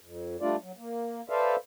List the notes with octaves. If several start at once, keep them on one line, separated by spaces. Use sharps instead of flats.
F2
G3 A3 D4 F4 D5
F#3
A#3
A4 B4 C5 D5 E5 F5